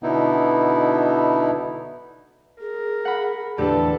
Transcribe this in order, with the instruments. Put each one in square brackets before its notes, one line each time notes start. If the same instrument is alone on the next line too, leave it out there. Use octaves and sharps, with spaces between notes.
[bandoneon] B2 D3 B3 D#4 E4
[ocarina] G#4 [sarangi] A#4
[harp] F#5 B5
[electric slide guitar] E2 A2 D3 [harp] G4 B4 [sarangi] A4 [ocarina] D5